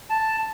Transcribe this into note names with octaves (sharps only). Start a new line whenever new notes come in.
A5